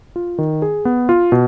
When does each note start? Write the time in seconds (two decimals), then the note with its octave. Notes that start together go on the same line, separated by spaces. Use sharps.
0.16 F4
0.38 D#3
0.62 G#4
0.85 B3
1.09 F4
1.32 B2